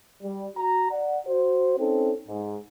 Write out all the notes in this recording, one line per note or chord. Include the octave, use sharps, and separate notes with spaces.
G3
F#4 A#5
D5 F#5
F#4 C5
C4 C#4 D#4 A4
G#2